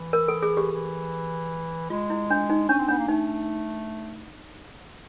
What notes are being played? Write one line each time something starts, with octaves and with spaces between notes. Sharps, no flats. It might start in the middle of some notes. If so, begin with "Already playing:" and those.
Already playing: E3
A#4
A4
G#4
G4
E3
G#3 F4
E4
D4
D#4
C#4 D4
C4
B3 D4
A#3
A3 D#4